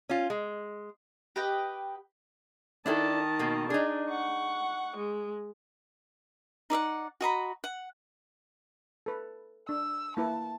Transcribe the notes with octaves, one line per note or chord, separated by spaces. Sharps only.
C#4 F4
G#3
G4 B4 D#5 G5
D#3 D4 E4 A4 A5
B2 A#3
D4 D#4 G#4
F#5 C#6
G#3
D#4 D5 E5 F#5
F#4 D#5 A#5 B5
F#5
A4 B4
D4 E6
A#3 E4 B4 A5